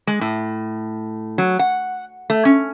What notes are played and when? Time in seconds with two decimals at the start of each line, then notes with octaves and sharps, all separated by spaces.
0.07 G#3
0.21 A2
1.38 F#3
1.59 F#5
2.30 A3
2.45 C#4